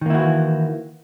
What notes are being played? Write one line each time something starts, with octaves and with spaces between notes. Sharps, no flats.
D#3 E3 A#3 E4 F#4